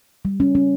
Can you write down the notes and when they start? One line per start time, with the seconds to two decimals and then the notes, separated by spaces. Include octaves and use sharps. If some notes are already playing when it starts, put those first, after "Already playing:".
0.25 G3
0.40 C#4
0.55 C#4